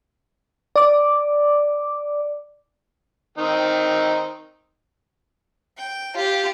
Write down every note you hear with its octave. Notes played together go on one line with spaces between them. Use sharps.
D5 D6
D#3 C4 D#4
G5
F4 G4